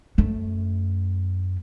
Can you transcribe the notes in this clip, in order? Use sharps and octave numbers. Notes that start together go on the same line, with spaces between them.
F#2 A3